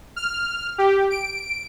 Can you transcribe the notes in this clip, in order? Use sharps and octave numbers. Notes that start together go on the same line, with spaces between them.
F6
G4
D7